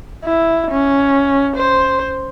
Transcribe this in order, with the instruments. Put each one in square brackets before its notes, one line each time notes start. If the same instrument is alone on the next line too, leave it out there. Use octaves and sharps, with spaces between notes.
[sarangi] E4
C#4
C5